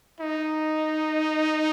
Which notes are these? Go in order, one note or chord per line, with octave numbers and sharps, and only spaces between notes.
D#4